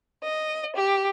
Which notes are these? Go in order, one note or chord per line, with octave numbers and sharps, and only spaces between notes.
D#5
G4